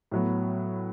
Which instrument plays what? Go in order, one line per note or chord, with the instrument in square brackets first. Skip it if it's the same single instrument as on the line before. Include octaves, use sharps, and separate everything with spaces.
[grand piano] A2 F#3 B3